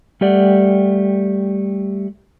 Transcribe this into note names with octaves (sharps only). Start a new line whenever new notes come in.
G3 A3 G4 D5 F#5